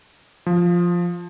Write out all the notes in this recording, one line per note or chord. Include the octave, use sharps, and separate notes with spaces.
F3